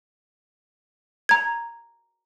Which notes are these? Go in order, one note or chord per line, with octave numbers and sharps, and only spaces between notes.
A#5 G#6